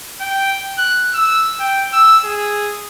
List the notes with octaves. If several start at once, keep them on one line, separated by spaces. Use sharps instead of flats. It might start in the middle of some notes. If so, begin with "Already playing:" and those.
G5
F#6
E6
G5
E6
G#4